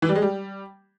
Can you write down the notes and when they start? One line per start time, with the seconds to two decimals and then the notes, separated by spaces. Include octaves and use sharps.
0.02 E3
0.09 G3
0.15 G#3
0.22 G3